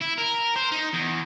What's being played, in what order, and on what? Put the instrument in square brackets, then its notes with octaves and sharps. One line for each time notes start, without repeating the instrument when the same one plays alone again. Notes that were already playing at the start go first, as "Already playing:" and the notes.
[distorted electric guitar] E4
A#4
C5
D#4
E2